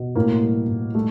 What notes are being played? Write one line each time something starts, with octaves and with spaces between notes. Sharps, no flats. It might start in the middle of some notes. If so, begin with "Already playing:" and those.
Already playing: B2
A2 A#3
G3
A2
G3 A3